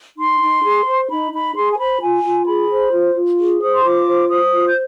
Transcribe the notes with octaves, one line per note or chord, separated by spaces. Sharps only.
D#4 C6
D#4
G#4
C5
D#4 B5
D#4 B5
G#4 C6
G#5
C5 B5
F4 G#5
F4
G#4 B5
C5
F4
F4
G#4
C5 D#6
C6
F4 D6
C5
C5 D#6
F4
G6